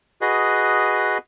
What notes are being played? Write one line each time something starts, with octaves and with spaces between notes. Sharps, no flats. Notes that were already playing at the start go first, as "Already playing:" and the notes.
F#4 G#4 B4 D#5